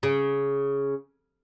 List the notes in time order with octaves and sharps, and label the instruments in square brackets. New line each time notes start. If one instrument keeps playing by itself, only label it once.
[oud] C#3